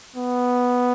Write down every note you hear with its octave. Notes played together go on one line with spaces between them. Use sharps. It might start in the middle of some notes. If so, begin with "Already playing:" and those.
B3